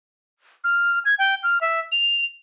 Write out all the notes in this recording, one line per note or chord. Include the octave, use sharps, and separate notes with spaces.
F6
G#6
G5
F6
E5
F7